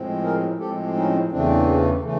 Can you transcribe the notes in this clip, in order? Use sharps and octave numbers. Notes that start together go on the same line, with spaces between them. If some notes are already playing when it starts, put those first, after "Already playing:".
Already playing: A2 F3 G#3 C4
G#4 A#4
A2 F3 G#3 C4 G4 A4
C#4 D#4
E2 C#3 E3 A3 C4 D4
C#3 E3 A3